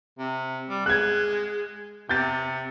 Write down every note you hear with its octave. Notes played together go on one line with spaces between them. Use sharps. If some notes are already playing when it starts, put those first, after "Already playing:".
C3
G3
G#3 F#6 G#6
C3 G6 A6